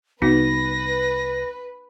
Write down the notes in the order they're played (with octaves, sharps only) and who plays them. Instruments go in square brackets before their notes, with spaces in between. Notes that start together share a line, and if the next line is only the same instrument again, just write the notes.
[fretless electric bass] C2 [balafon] B3 D#4 F#4 [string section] B4 [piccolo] A#6